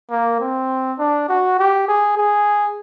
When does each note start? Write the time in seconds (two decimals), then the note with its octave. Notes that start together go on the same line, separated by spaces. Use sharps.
0.11 A#3
0.40 C4
0.99 D4
1.29 F#4
1.59 G4
1.88 G#4
2.17 G#4